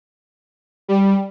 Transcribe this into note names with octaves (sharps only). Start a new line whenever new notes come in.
G3